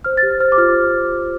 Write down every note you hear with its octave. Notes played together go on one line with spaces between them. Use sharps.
C5 F6
A6
G4
C5 F6
D6
F4 F6